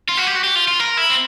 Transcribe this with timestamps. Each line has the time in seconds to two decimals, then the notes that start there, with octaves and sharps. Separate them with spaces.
0.09 F4
0.17 F#4
0.27 G4
0.36 F#4
0.44 G4
0.56 F4
0.68 F4
0.80 A#4
0.97 E4
1.10 C4